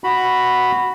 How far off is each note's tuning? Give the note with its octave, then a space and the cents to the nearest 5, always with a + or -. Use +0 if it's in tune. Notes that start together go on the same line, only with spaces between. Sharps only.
F#4 +0 B5 +0